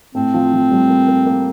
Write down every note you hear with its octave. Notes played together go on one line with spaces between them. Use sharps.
A2 A3 C4
F3 F4
F3 F4
G3 G4
A#3 A#4
A#3 A#4
A#3 A#4